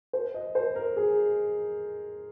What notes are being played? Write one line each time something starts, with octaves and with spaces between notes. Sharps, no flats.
C5
D#5
C5
A#4
G#4